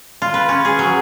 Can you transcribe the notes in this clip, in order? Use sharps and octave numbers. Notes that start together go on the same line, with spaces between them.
F4
B4
C#4
G#4
F#3